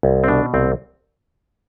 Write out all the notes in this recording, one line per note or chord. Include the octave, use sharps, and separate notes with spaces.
C2
C4
B2 D4
C2 C4